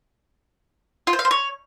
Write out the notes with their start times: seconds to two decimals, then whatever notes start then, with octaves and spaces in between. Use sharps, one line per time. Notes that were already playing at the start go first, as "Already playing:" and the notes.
1.07 F4
1.13 C5
1.19 F5
1.25 C5
1.31 C#5